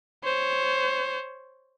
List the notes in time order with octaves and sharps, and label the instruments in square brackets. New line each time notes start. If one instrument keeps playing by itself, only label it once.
[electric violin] C5 C#5